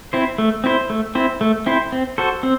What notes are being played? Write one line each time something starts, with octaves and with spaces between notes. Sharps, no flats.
C4 E4 C5
A3
C4 E4 C5
A3
C4 E4 C5
A3
C4 E4 C5
C4
F#4 A4 C5
C4